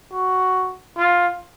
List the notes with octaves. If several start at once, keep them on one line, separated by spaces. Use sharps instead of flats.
F#4
F4